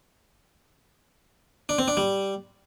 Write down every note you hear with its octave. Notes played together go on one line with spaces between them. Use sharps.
D4
C4
D4
G3